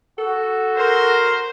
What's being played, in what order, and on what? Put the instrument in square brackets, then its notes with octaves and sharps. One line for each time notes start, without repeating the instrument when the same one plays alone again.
[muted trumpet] F#4 [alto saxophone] A4
[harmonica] A#4 [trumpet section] C5